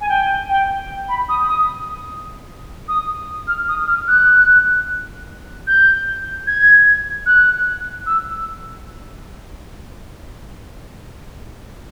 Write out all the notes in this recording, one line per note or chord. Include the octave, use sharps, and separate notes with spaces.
G#5
G5
G5
B5
D#6
D#6
D#6
F6
D#6
F6
F#6
G6
G#6
F#6
E6